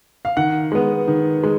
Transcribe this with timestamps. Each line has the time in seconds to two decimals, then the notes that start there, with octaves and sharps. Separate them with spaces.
0.25 F5
0.37 D#3 F#5
0.72 G#3 B3
1.08 D#3
1.44 G#3